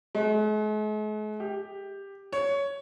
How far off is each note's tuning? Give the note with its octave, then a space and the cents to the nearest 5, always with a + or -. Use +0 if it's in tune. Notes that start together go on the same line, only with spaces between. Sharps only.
G#3 +45
G4 +10
C#5 +10